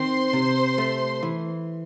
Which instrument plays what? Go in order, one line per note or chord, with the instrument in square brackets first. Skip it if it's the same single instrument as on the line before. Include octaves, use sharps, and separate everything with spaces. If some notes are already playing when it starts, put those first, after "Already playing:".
Already playing: [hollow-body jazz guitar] D#3 C4 [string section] C5 C6
[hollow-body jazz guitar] C3
A3
E3